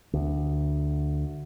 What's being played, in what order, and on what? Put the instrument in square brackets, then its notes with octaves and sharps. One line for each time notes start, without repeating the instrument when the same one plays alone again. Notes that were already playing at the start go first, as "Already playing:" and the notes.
[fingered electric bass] D2